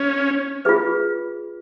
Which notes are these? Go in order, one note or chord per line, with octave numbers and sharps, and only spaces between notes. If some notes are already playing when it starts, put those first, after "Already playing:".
Already playing: C#4
F4 G#4 B4